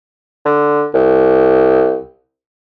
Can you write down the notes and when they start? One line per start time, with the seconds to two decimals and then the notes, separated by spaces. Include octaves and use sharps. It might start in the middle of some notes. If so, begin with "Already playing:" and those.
0.45 D3
0.94 C2